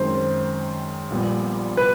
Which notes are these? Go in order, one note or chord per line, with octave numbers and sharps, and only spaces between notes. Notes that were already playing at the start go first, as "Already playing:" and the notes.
Already playing: F#2 D#3 G#3 C4 C5
A#1 A#2 G3 B3
B4